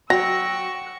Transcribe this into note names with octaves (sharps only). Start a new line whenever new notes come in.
F#3 F#5 G5 C#6 E6 A#6